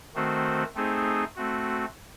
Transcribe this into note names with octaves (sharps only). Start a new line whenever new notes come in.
D#3 A3 C4 F#4 C5
A3 C4 D#4 G#4 C5
A3 C4 F#4